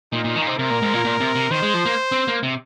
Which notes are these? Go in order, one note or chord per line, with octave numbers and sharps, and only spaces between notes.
A#2 D#4
A#2
D#3
A#2
C3
C3 A#4
A#2
G#2
A#2
A#2
C3
C3
D#3 C5
G#3
F3
A#3
C4
A#3
C3